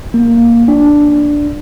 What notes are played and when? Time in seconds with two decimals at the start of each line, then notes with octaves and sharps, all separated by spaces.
0.14 A#3
0.68 D4